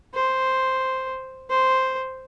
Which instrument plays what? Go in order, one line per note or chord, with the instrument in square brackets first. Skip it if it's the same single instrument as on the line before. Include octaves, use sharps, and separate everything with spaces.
[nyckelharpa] C5
C5